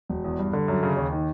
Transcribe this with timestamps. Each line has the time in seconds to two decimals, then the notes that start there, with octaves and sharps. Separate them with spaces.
0.09 E1
0.24 E2
0.39 G2
0.53 D3
0.68 F#2
0.83 C#3
0.97 D#2
1.12 D#3